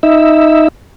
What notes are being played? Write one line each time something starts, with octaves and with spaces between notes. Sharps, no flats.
D#4 E5